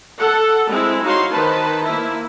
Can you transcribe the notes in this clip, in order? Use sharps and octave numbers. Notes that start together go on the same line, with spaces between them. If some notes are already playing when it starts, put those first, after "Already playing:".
A4 F#5
G#3 C4 E4
D#4 F#4 C#5 F5 C6
D#3 B4 C5 A5
A#3 E4